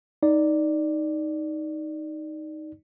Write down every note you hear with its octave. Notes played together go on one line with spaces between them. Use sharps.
D#4 D5